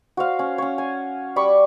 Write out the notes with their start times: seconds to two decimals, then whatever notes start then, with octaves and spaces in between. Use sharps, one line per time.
0.17 F#4 C5 F5
0.39 C#4
0.58 C#4 C#5
0.78 G#5
1.36 G3 D5 B5 C#6